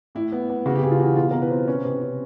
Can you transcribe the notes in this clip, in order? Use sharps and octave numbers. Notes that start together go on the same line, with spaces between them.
A2 E4
B3
B3
C#3 F#4
G4
C#3 G#4
F4
E3 F#4
B2 F4
B2 A#4
B4
C4
C#4 B4
C3 B4
C#4